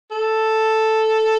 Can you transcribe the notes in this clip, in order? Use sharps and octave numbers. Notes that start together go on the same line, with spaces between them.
A4